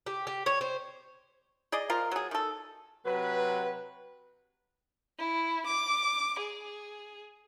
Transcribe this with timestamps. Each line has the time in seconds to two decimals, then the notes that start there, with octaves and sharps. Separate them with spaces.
0.06 G4
0.27 G4
0.46 C#5
0.61 C5
1.72 G#4 D5 D#5
1.89 F3 F4 A#4
2.11 F#3 G#4
2.31 D#3 A4
3.06 C3 F#3 B4
5.19 E4
5.66 D6
6.39 G#4